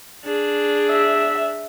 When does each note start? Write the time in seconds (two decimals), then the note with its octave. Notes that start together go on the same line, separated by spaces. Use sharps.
0.24 D4 G#4
0.91 E5